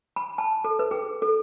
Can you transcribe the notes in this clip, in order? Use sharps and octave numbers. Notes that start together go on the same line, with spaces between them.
B5
A5
A4
B4
G#4
A4